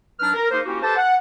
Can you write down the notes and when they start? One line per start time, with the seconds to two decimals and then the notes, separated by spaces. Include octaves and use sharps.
0.20 F#3 D4 D#4 B4 F6
0.34 A#4
0.51 A#3 D#4 G#4 A#4 C5
0.65 A#3 C#4 E4 F#4 G4
0.83 G4 A4 B4 C5 A5
0.97 F#5